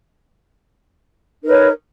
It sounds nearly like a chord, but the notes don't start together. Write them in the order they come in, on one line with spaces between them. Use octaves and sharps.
D#4 A#4 B4 C#5